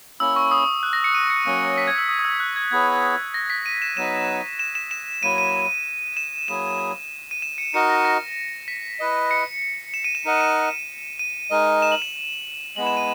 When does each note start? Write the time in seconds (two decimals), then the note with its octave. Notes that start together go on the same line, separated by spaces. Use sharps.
0.20 A#3 C#4 E4 E6
0.36 C#6
0.51 D#6
0.83 F#6
0.93 A#6
1.04 C#7
1.15 D#7
1.30 C#7
1.46 F#3 A#3 C#4
1.78 B6
1.87 G#6
1.98 E6
2.08 D#6
2.19 D#6
2.25 E6
2.40 F#6
2.56 G#6
2.71 B3 E4 G#4 C#5 G#6
3.34 A#6
3.50 B6
3.66 D#7
3.82 E7
3.97 F#3 B3 D#4 E7
4.59 E7
4.75 E7
4.91 E7
5.23 F#3 A#3 E4 D#7
5.38 D#7
6.17 E7
6.48 F#3 A#3 E4 G#4 E7
7.31 D#7
7.42 E7
7.58 C#7
7.74 D#4 F#4 A#4 D#5 C#7
7.89 A#6
8.05 A#6
8.68 B6
9.00 E4 B4 D#5
9.31 C#7
9.94 E7
10.04 D#7
10.15 E7
10.25 D#4 A#4 D#5 F#5
10.41 D#7
11.19 D#7
11.50 G#3 D#4 A#4 D#5
11.82 E7
11.92 F#7
12.02 E7
12.76 G#3 B3 E4 F#7
12.87 E7
12.97 D#7